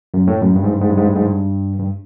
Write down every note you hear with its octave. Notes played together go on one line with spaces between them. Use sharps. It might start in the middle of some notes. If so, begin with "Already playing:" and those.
F#2
A2
F#2
G2
G#2
G2
G#2
G2
G#2
G2
G#2
G2
G2